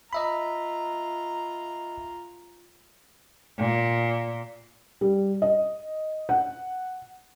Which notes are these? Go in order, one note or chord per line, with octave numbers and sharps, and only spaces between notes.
F4 D#5 E5 A#5 B5
A#2
G3
D#5
F#5